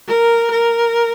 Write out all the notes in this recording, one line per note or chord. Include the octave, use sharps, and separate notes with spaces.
A#4
A#4